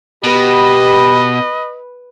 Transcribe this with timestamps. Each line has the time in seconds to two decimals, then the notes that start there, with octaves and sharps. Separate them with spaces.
0.24 B2 G4 B4 D#5 B5